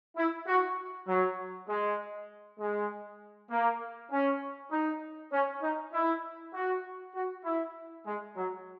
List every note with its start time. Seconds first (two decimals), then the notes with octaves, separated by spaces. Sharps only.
0.16 E4
0.47 F#4
1.07 F#3
1.68 G#3
2.59 G#3
3.51 A#3
4.11 C#4
4.71 D#4
5.32 C#4
5.62 D#4
5.93 E4
6.54 F#4
7.15 F#4
7.44 E4
8.06 G#3
8.36 F#3